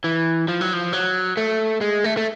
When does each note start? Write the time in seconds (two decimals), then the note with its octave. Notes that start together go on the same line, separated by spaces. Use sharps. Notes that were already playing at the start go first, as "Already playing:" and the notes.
0.04 E3
0.48 F3
0.61 F#3
0.73 F3
0.93 F#3
1.37 A3
1.81 G#3
2.04 A3
2.17 A3